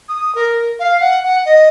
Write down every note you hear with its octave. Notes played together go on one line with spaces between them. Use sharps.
D#6
A#4
F5
F#5
F#5
D#5